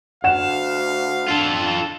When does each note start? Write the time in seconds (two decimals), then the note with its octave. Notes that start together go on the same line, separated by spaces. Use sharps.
0.24 D2 F5 F#5 E7
1.28 D4 F4 A4